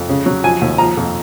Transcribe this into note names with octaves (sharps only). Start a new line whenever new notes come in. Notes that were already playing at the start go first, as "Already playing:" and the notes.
Already playing: F2
C#3
F#3
F3 G#5
D#2
F3 A#5
F2